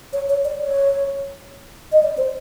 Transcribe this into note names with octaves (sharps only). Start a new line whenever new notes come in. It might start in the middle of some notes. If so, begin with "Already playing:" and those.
C#5
C#5
D5
C#5
D#5
D5
C5